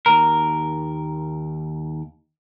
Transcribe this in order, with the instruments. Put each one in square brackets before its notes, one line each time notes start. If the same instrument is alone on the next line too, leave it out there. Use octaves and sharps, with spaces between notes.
[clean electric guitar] D#2 A#4 [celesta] A#5